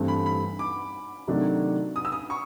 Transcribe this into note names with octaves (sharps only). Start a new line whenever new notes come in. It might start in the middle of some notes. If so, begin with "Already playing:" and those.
Already playing: G2 E3 A3 C4
B5
B5
D6
C3 D#3 F#3 A3 D4
D#6
E6
D#6
C#6